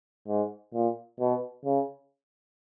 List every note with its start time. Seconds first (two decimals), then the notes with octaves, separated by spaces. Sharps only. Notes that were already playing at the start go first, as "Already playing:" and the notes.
0.28 G#2
0.74 A#2
1.20 B2
1.65 C#3